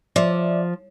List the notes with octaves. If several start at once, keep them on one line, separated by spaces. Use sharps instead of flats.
F3 D5 E5